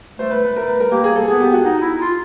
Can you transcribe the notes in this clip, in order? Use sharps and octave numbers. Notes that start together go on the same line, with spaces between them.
A3 C5
B4
B4
A3 A#4
B4
A#4
A#3 G4
G#4
A4
B3 G#4
G4
F#4
D#4
E4
F4